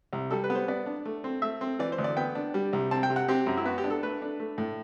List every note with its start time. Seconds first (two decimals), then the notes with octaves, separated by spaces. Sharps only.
0.13 C2
0.31 G3 A4
0.44 B4
0.50 B3
0.55 C5
0.68 B3 D5
0.86 D4
1.05 A3
1.24 C4
1.42 A3 E5
1.61 C4
1.79 E3 D5
1.92 C5
1.98 D2
2.04 D5
2.17 B3 G5
2.35 D4
2.54 G3
2.73 C2
2.91 C4 A5
3.03 G5
3.10 C3
3.16 F#5
3.28 C4 G4
3.46 F#2
3.57 E4
3.65 B3 F#4
3.78 G4
3.84 D4
3.90 A4
4.03 A3 B4
4.22 D4
4.40 A3
4.58 A2